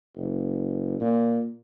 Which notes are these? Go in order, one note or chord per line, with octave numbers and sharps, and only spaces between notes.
F#1
A#2